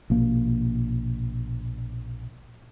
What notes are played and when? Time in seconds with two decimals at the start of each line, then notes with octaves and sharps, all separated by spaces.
0.10 A#1 B2 A#3